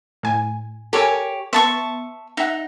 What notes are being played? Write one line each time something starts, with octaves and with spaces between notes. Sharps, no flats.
A2 G#5
G4 A4 A#4 C#5 G#5
B3 E5 A5 C6 C#6 C#7
D#4 E5 F#5